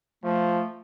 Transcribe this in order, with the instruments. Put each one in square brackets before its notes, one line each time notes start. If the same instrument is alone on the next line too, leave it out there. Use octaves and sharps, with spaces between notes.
[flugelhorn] F3 [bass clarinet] A3